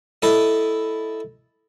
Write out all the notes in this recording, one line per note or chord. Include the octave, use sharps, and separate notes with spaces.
E4 A4 D#5